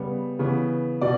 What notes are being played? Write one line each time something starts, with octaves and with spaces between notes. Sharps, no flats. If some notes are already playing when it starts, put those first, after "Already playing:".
Already playing: C#3 G3 B3
C#3 E3 B3
B2 D5